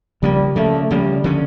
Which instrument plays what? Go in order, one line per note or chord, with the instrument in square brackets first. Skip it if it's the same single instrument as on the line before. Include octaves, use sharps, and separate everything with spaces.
[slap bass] C#3 F3 A#3 [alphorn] G3
[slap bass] C#3 F3 A#3 [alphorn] A3
[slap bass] C#3 F3 A#3 [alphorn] G3
[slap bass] D3 F3 C#4